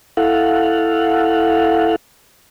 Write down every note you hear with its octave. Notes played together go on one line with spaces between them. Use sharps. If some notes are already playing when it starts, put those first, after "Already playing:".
E4 A4 F5 F#5